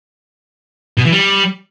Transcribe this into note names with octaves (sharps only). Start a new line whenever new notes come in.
B2
E3
G3